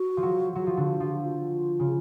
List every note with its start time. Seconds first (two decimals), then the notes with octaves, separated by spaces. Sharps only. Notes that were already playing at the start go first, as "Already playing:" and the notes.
Already playing: F#4
0.17 F3
0.23 F#3
0.55 F#3 F#4
0.67 F3
0.77 D3
1.00 F3
1.22 F4
1.80 C#3